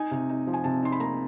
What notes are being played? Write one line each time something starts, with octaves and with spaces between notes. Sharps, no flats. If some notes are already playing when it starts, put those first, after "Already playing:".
Already playing: D#4 G#5
C3
D#4
F3
G#5
C3 A5
D#4 C6
B5
A#3 A#5